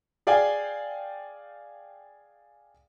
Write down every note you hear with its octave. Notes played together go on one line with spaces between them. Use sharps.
G#4 D5 F5 G5 G#5